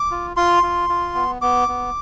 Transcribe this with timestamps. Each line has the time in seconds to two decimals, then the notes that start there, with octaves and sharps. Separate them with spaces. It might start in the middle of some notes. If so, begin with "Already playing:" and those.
Already playing: D6
0.11 F4
0.36 F4 C6
0.63 F4
0.89 F4
1.15 B3
1.42 B3 D6
1.68 B3